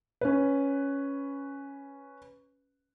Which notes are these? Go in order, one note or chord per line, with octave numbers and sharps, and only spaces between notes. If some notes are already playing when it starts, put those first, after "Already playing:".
C#4 B4